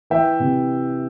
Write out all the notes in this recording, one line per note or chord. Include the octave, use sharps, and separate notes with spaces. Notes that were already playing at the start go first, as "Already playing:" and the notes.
E3 E5 G5
C3